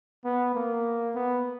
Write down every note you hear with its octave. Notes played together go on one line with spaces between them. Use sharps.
B3
A#3
B3